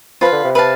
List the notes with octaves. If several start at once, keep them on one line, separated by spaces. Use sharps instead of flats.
F3 F4 B4 F5
D3
C3
B4 F5 A5